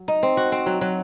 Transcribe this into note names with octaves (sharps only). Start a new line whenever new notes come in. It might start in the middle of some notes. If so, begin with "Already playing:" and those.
Already playing: F#3
D#4
C4
F#4
C4
F#3
F#3